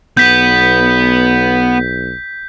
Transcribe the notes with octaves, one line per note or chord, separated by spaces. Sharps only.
B1 B3 G6 B6